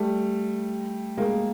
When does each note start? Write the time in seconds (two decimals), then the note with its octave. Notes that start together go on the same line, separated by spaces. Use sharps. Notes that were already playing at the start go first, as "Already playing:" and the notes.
Already playing: G3 A3
1.18 G#3 A#3